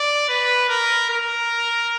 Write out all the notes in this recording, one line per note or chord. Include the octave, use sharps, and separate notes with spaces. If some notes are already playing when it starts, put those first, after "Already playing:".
Already playing: D5
B4
A#4
A#4